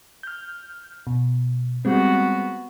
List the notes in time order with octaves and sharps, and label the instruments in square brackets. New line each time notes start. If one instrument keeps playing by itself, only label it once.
[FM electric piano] F6 G6
B2
[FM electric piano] G3 G#3 C4 [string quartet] B3 F#4